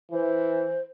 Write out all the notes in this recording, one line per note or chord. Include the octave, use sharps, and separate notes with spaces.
E3 C5